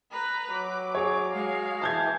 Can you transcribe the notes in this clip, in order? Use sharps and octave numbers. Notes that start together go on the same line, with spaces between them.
B4 A#5
F#3 D6
G#4 C#5
G#3 F5
E3 A5 G6 G#6